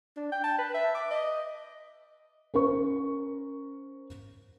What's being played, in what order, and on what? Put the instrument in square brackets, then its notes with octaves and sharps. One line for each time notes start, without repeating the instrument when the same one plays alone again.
[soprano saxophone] D4
G5
A5
B4
E5
D6
D#5
[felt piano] C#4 A#4 C5 C#6